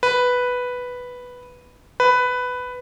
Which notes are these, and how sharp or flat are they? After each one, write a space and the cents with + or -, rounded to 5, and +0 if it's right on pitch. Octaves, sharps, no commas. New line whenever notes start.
B4 +0
B4 +10